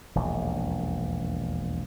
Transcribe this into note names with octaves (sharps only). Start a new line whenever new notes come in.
E1 A#1 D#2